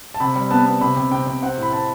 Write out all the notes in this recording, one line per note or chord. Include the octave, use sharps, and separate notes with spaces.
A5
C3 B5
G3
B3 A5
B3
C3 B5
C3
C3 G5
C3
C4 F#5
A2 B5
C4 A5